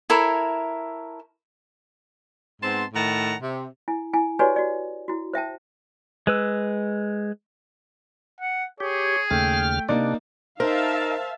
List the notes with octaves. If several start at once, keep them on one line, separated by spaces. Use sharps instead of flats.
E4 A4 A#4 C#5
G#2 B3 C4 A5 C6
A2 D#3 F#5 A5 A#5
C3
E4 G#5
E4 G#5
F#4 G4 B4 C#5 D5 G#5
F#4 D5
E4 F#4
C5 E5 G5 A5
G#3 B4 E6
F#5
G4 G#4 C#5
D#2 C#3 A3 G5 F6
C3 A#3 D4 D#4 D5
D#4 A#4 C5 E5 F5 A5